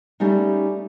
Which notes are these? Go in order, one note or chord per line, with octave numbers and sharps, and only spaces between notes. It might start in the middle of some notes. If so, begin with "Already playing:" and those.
G3 A3 C#4 D#4